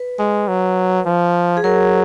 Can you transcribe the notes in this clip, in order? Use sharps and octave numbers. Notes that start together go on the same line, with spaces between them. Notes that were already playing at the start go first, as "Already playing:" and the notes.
Already playing: B4
G#3
F#3
F3
G#4
F#3 A#4